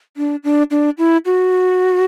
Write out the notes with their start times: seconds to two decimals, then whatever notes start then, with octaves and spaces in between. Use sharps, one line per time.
0.17 D4
0.44 D4
0.71 D4
0.98 E4
1.26 F#4